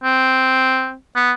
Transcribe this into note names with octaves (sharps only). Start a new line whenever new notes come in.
C4
B3